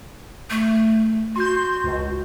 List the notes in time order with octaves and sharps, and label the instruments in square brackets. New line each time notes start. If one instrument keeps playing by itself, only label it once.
[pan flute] A3
[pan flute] F#4 [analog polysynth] C6 G6
[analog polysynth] C#2